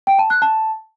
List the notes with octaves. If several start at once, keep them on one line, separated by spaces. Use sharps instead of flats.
G5
A5
F#6
A5